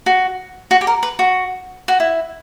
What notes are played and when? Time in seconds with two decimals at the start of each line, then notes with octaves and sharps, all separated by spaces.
0.06 F#4
0.71 F#4
0.81 G4
0.87 A#4
1.03 B4
1.19 F#4
1.88 F#4
2.00 E4